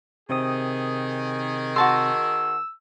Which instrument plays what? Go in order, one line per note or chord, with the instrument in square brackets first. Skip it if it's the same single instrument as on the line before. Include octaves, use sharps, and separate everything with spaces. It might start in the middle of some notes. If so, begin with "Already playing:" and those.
[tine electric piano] C3 C4 D#6 [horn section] D#3 G#4
[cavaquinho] F#4 A5 C6 [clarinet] E6